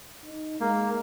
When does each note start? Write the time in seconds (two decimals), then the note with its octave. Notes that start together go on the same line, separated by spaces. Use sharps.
0.25 D#4
0.60 G#3 A#3